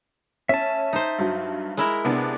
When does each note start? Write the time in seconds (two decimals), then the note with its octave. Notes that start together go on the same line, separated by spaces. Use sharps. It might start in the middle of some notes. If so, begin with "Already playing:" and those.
0.49 C#4 E5 A5
0.93 D#4 C5
1.18 G2 F#3
1.77 G#3 E4 A#4
2.05 C3 B3 D4